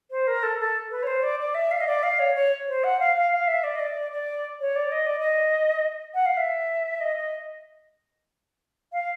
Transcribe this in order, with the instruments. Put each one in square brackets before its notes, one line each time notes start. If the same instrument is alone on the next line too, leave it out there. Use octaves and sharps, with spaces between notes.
[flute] C5
A#4
A4
A4
B4
C#5
C5
D5
D5
E5
F5
D#5
D5
F5
C#5
C#5
C5
F#5
F5
F5
F5
E5
D5
D#5
D5
D5
C#5
D5
D#5
D5
D#5
F#5
F5
E5
D#5
D#5
F5